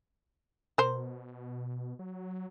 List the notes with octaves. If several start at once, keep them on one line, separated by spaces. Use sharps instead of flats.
B2 A#4 C5
F#3